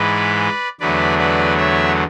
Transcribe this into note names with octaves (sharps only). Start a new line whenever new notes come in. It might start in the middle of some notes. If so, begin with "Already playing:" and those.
Already playing: G#2 E3 G#3 B4 D5
E2 D3 F#3 A3 B4 D5
B4 D5
C#5 E5